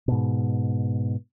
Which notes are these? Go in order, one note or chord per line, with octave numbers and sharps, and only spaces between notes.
G#2 B2